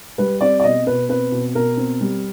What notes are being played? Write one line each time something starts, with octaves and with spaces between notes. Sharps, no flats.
G3 B4
C4 D5
D5
B2 D#5
B2 B4
C4 B4
B2
B2 A#4
C4
G3